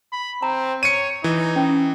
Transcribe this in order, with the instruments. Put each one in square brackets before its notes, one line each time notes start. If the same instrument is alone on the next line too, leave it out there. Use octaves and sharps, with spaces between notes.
[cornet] B5
[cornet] C4 [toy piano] A#5
[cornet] C#5 [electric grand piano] C#7 D#7
[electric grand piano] E3 [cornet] D#4
[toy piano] C#4